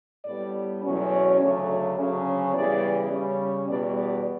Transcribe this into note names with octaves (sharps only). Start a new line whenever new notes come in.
A2 G3 B3 D5
E2 B2 F#3 A3 C#4
D5
D2 C#3 F#3 A3 C#4 C#5
C#5
D2 C#3 F#3 C#4
C#3 E3 G3 B3 D5
C#3 G3 C#4
E2 B2 G3 B3 D5
D5